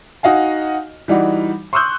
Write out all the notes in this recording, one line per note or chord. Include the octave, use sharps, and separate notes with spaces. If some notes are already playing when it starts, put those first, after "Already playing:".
D#4 F#4 D#5 F5 G#5
E3 G3 D#4 F#4
C6 C#6 D#6 E6 F#6 G6